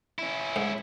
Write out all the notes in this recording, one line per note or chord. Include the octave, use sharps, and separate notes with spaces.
C#4 E4
G#2